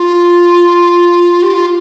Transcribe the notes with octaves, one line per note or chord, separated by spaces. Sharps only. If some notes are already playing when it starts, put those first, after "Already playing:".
Already playing: F4
G4
F4